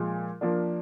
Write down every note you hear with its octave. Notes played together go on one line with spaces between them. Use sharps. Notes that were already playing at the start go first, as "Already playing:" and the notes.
Already playing: A#2 F3 G#3
F3 A#3 D4